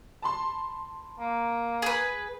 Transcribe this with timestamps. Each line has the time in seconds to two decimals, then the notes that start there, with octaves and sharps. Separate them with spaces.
0.22 A5 B5 C6
1.19 A#3
1.82 G#4 B4